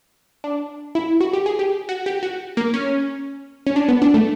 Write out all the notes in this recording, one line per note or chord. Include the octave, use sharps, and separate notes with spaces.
D4
E4
F#4
G4
G#4
G4
F#4
G4
F#4
A#3
C#4
C#4
D4
B3
D4
A3